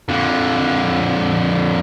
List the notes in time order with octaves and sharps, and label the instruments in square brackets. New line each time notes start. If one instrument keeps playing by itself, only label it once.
[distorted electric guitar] F2 D3